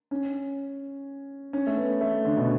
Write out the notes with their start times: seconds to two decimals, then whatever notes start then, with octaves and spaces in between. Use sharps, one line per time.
0.11 C#4
1.53 C#4
1.67 A3
1.77 B3
2.01 A3
2.25 D3
2.37 B2